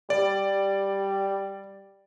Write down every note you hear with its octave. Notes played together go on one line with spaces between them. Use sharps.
G3 D5